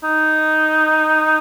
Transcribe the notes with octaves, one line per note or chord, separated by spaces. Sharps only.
D#4